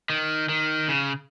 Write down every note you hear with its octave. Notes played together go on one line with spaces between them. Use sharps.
D#3
D#3
C#3